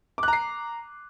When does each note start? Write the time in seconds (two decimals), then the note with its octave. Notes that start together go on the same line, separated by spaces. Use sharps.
0.18 D6
0.23 F#6
0.28 A#5
0.33 C7